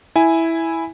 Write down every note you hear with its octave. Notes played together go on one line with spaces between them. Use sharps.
E4 G#5